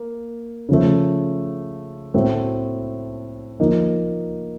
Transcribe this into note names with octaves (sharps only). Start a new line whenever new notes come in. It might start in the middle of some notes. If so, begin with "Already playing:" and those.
Already playing: A#3
C#3 F3 A3
A2 A3 C4 F#4
F3 A#3 D#4